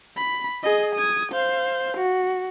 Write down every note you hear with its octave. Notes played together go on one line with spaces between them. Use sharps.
B5
G#4 D#5
D#6 G#6
C5 F5
F#4